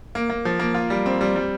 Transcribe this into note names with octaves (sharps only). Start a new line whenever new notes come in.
A#3
A#3
F3
A#3
F4
G3
C4
G3
G3